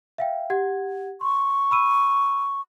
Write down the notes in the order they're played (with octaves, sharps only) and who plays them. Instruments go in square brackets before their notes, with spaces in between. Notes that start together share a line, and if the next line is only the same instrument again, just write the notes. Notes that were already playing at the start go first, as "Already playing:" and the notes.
[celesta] E5 F5 G5
G4 F#5 G#6
[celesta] C6 [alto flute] C#6
[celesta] B5 E6 D#7